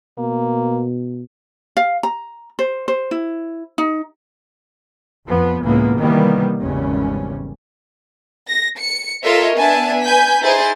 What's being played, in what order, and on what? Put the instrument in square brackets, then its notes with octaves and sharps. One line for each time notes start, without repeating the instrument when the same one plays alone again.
[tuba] B2 [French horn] A#3
[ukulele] F5
A#5
C5
C5
E4
D#4
[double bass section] F2 F3 B3
C#2 A2 E3 G#3 A#3 B3
C3 D#3 E3 G3 A#3 B3
G#1 E2 C#3 G3 C#4
[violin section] A#6
C#7
F4 A4 A#4 C#5 D#5 E5
B3 D4 E5 G#5 A5
B4 G#5 G6 B6
D#4 E4 G#4 C5 A6